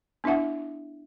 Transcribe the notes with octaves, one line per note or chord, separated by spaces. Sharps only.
B3 D4 E4 E5 F#5